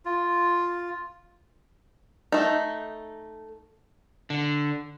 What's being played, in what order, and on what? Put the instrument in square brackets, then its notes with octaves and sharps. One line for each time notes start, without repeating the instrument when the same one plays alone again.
[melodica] F4
[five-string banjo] A3 D#4
[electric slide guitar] D3